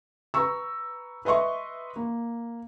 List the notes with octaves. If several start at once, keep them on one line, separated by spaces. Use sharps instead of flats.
B4 A#5 C#6 E6
B4 D#5 E5 C6 C#6
A#3